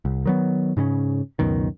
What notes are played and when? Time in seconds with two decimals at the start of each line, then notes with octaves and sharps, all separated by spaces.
0.05 C2
0.26 D#3 F#3 B3
0.77 G#2 C#3 C4 C#4
1.39 C#2 F#2 B2 D#3